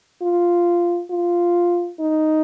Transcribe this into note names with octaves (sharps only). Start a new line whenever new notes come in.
F4
F4
D#4